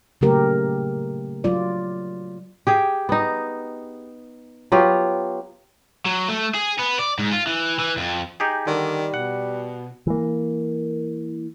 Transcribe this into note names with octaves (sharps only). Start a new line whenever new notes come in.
C#3 F#3 A3 A#3 G4 A#4
F#3 F4 D5
G4 G#4 G5
B3 D#4
F#3 B3 F4 G4
F#3
A3
G#4
B3
D5
G#2
F4
E3
E3
F2
D#4 G4 G#4
D3 D#3 G3
B2 F#5
E3 A#3